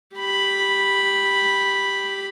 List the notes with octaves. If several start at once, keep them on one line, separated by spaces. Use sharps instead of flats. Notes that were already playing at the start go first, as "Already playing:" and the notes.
G4 B5